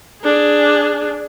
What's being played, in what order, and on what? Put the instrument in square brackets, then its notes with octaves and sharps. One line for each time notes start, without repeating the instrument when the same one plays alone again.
[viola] D4 G#4